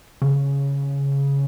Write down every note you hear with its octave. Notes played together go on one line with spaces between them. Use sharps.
C#3